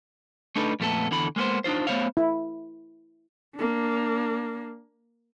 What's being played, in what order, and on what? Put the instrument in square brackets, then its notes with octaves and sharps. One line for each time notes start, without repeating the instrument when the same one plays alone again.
[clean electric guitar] A3 D4 D#4 A4 B4
F2 A#2 A3 B3 A4
E2 D3 E3 A4 B5
G#3 A#3 B3 C5
D4 D#4 F4 C5
A3 B3 C5 C#5 F5
[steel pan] E4
[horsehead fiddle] A#3 D4